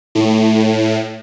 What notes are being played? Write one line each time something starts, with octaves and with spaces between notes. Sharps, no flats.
A2